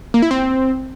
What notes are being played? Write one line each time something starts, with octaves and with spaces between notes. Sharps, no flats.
A#3
E4
C4